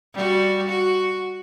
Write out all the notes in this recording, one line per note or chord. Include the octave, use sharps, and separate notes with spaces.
G3 F#4
F#4